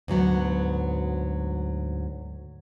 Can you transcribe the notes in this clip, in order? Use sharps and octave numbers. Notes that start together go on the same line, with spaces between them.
D2 G#2 F#3 B3